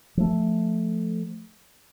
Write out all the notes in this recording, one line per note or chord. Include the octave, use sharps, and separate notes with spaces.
F3 A3